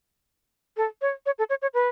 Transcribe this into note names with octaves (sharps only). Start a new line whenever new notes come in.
A4
C#5
C#5
A4
C#5
C#5
B4